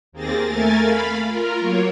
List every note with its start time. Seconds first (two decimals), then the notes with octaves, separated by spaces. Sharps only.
0.12 D#2 A#3 C4 G#4 A6 A#6
0.42 A3 A#4 G#5 A6
0.78 F5 B5
1.25 F4 A#4
1.59 F#3 A#3 C#5